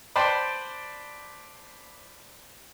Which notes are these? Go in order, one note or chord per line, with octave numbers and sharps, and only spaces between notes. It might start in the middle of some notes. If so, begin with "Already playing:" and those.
B4 C5 D5 G5 A5 C6